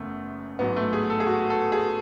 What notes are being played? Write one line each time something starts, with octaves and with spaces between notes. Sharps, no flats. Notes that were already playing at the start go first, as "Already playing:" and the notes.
Already playing: F#1 E2 C#3 A3
A1 G#2 F#3 B3
A3
G#4
A4
G#4
F#4
A4
G#4